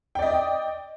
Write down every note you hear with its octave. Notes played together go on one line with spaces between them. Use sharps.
D5 D#5 G5